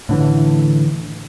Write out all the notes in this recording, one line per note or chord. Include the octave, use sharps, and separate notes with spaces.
A2 D3 E3